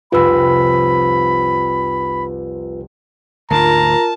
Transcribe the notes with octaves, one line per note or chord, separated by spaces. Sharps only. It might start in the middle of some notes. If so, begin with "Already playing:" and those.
F1 C2 F4 B4 B5 E6
D2 G#2 D3 F4 A#4 A5 A#5